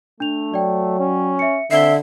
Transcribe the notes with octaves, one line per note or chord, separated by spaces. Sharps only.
A3 D4 F7
F#3 D5 G5
C#4
E5 C#7
D3 C4 E5 C7 G7